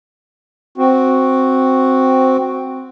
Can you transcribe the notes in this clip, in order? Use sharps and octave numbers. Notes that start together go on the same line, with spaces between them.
C4 F#4